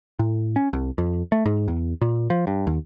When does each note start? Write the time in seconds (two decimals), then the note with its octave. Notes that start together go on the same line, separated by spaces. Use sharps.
0.19 A2
0.56 C#4
0.73 C2
0.98 F2
1.32 A3
1.46 G#2
1.68 E2
2.01 A#2
2.30 F3
2.47 G2
2.67 D#2